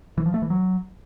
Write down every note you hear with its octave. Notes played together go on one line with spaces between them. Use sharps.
E3
F3
A3
E3
F#3